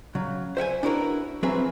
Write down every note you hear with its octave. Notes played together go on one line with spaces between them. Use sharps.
C#3 F#3
C5 E5 F#5 G#5
D4 E4 F#4 A#4 B4
F3 F#3 C4 G#4 B4 E5